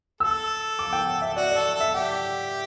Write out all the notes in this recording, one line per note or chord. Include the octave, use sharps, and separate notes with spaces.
A4 E6
D6
G5
F#5
E5
F#4 D5
A4 D5
A4
E5
G4 F#5